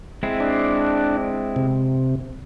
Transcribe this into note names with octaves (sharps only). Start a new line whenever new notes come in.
G#3 C4 E4
D4
C3